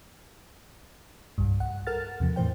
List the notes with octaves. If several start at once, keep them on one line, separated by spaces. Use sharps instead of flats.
C2 G2
F#5
A4 A#4 F#5 F6 A6
E2 C3 F3
A2 E3 C5 G5